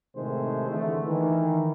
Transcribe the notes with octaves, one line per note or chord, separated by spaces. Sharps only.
A2 C3 D#3 G#3 A3 C5
D3 E3 G#3 A3
D#3 E3